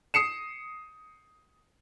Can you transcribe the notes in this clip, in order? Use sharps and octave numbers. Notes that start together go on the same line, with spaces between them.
D#6 C7 C#7 E7